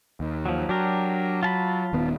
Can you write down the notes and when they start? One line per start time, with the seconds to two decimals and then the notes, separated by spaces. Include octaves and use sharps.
0.20 D#2
0.46 F3 F#3
0.69 F#3 D4 G4 A#4
1.43 F4 A5 B5
1.93 D#1 D#3 B3